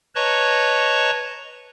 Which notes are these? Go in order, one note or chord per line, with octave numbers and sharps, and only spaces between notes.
B4 C#5 D#5 A5 A#5 C#6